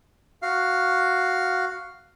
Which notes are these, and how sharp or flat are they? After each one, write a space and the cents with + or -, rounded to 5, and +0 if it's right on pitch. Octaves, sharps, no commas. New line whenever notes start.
F#4 +0 F5 +0